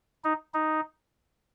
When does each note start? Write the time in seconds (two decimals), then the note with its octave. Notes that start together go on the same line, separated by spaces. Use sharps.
0.24 D#4
0.54 D#4